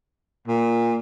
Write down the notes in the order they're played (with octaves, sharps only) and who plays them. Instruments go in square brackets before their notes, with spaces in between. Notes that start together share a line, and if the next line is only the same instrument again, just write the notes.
[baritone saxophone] A#2